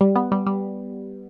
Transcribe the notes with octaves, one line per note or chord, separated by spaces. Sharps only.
G3
B3
G3
G3